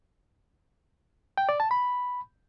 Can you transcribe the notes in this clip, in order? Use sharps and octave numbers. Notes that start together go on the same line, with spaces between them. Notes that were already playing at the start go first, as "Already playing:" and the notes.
G5
D5
A5
B5